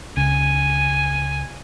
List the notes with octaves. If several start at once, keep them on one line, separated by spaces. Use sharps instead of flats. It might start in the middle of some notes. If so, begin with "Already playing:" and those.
C#2 C#3 G#5